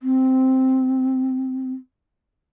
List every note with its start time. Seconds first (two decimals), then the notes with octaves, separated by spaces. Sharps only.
0.02 C4